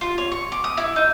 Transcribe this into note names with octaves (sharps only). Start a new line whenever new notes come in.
F4
C#5
C#6
D6
D#6
E4
D#4